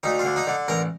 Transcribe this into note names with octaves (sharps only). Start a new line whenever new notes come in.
D2 D#4
F4
D3
D#4
D3
A1 A#4